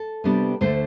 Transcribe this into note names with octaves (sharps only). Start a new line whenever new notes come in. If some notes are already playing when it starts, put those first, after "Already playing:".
Already playing: A4
C3 G3 B3 D4
D2 D3 A3 D4 C5